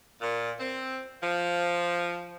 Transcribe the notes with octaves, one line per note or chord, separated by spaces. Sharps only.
A#2
C4
F3